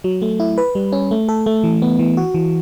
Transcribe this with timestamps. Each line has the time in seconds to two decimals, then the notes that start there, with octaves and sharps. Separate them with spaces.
0.04 F#3
0.22 A3
0.40 E4
0.58 B4
0.75 G3
0.92 C#4
1.11 A3
1.29 A4
1.46 A3
1.64 E3
1.82 B3
1.99 E3
2.17 F#4
2.34 E3